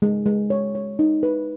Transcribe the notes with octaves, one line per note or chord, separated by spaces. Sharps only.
G#3
G#3
C#5
C#5
D#4
B4